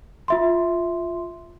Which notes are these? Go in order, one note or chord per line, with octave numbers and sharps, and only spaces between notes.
F4 E5 C6